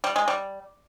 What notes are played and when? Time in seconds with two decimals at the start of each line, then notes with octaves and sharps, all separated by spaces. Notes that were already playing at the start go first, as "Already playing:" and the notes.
0.04 G3
0.16 G#3
0.28 G3